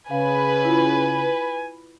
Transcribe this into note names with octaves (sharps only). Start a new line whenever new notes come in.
C#3 B4 F5 G#5
E4 F4